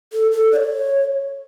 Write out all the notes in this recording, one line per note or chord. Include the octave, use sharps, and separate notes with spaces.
A4
A4
D5
C#5